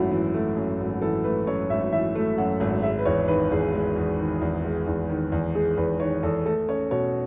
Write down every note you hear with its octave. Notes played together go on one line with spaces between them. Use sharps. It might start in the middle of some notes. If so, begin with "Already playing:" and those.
Already playing: G#1 F#2 A3 E4 F#4
E3
A3
F#2
G#1
E3 A4
A3 B4
F#2 C#5
G#1 E5
E3 E5
A3
F#2 F#5
G#1
G#3 E5
B4
E2 C#5
D#3 B4
E2 G#4
G#3
E2
D#3
E2
G#3
E2
D#3
E2
G#3 G#4
E2 B4
D#3 C#5
E2 A4
A3 A4
C#4 C#5
B2 C#5